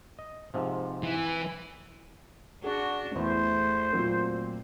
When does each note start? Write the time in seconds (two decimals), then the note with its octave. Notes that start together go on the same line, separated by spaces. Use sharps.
0.19 D#5
0.54 G#2 C3 F3
1.03 E3
2.64 D4 F#4 G#4
3.15 E2 A3 E4 C5
3.93 A#2 F#3 C4